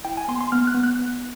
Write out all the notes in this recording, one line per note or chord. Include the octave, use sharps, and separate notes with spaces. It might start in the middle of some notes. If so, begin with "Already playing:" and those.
E4 G5
G#5
B3 C6
C6
B3 F6
F#6
B3
F#6
B3